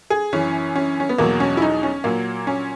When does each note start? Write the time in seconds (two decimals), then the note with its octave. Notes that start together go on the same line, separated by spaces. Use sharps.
0.10 G#4
0.33 F#2 E3 C#4
0.76 C#4
1.00 C#4
1.09 B3
1.18 E2 B2 F#3 A#3
1.40 C#4
1.57 E4
1.62 D#4
1.83 C#4
2.04 A#2 F#3 A#3
2.47 C#4